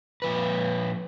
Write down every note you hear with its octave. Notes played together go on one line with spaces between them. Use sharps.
A#2 F3 B4